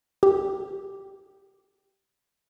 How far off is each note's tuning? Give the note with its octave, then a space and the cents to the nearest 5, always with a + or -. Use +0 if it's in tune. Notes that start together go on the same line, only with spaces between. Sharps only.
G4 -5